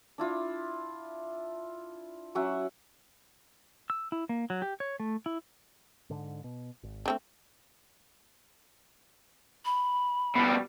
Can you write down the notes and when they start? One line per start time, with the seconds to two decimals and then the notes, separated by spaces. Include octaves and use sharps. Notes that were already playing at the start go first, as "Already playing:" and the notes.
0.18 D4 E4 F4
2.35 F#3 C#4 E5 F#5
3.90 E6
4.12 E4
4.29 A#3
4.50 F#3
4.62 G4
4.80 C#5
5.00 A3
5.26 E4
6.10 G#2 D3
6.44 B2
6.83 G#1
7.06 A3 C4 D4
9.65 B5
10.35 B2 G3